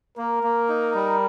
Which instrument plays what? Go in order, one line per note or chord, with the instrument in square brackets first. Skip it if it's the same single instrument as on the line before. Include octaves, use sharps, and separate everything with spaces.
[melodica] A#3 [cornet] A#4
[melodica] A#3
D#4
G3